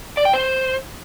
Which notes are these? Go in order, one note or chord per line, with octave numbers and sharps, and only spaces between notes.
D5
G5
C5